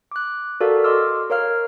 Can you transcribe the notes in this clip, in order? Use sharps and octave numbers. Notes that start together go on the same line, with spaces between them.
D6 F#6
F#4 A4 A#4 D5 F5
D#5 C6 D6 E6 F6
A#4 C#5 F5 F6